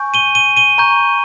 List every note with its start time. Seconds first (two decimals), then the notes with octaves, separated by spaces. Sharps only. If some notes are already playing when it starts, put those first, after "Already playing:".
Already playing: G#5 C#6 G6
0.14 D#7 G7
0.35 D#7 G7
0.56 D#7 G7
0.78 A#5 C#6 G6